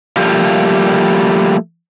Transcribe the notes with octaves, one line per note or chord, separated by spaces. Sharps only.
F3 G3 A3 A#3 G4